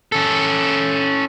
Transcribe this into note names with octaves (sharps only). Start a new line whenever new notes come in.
C#4 A4